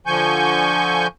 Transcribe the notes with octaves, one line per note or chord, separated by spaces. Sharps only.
D3 F3 G#5 C#6 G6